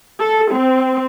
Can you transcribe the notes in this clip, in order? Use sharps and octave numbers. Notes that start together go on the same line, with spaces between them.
A4
C4